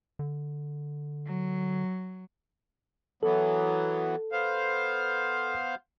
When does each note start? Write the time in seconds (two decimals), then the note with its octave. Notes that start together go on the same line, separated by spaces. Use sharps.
0.19 D3
1.26 F#3
3.23 E3 F#3 B3 A4
4.32 B3 C5 F5